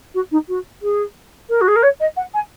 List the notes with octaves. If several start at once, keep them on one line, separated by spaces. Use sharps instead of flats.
F#4
D#4
F#4
G#4
A#4
F#4
G#4
A#4
C#5
D#5
F#5
G#5